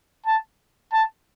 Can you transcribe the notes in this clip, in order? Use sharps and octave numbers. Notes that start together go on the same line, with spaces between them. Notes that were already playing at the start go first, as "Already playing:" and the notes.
A5
A5